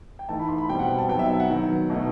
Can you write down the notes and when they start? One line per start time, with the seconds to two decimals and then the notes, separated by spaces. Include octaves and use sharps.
0.19 G5
0.29 E3 A3 D#4 A5
0.39 B5
0.49 C6
0.58 B5
0.69 B2 G3 C4 G5
0.79 F#5
0.88 G5
0.98 A5
1.09 B2 F#3 B3 D#4 G5
1.19 E5
1.30 E5
1.40 F#5
1.50 D#3 F#3 B3
1.90 B2 A3 D#4